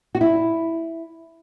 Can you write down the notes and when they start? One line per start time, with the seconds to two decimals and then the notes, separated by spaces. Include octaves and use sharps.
0.15 F#4
0.21 E4